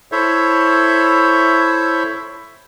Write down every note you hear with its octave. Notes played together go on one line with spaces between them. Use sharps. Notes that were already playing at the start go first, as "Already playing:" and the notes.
E4 A4 C5 C#5 E5